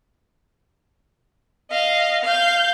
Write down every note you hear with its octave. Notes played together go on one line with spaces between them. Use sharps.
D#5 F5
F5 G6